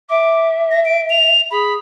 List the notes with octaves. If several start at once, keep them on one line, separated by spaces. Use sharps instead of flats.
E5 D6
A#6
D7
F7
G#4 B5